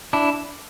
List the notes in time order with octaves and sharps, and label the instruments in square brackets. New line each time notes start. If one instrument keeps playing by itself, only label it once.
[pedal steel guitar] D4 E4